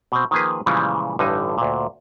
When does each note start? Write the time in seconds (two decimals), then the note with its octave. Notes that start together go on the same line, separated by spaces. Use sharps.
0.12 B2 C4
0.31 D#3 F3 A#3 G#4 B4
0.66 A#2 C#3 E3 F3 G3 G#3
1.19 A1 G2 D3 D#4 G#5
1.58 D2 A#2